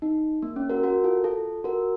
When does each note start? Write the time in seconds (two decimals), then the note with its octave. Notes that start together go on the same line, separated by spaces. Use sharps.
0.02 D#4
0.43 A#3
0.56 C#4
0.70 F#4 A#4
0.83 F#4 A#4
1.04 F4 A4
1.24 F4 A4
1.64 F#4 A#4